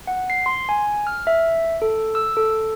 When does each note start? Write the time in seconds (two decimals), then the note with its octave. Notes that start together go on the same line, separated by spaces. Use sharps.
0.07 F#5
0.30 C7
0.46 C6
0.69 G#5
1.07 F6
1.27 E5
1.82 A4
2.15 E6
2.37 A4